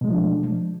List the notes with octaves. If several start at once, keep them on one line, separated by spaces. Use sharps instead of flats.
B2 F3 G#3 A3 D4